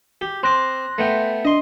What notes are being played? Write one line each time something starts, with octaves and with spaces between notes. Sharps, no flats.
G4
C4 C6 D6 F#6 A#6
A3 B3 G5
D4 D#5 C6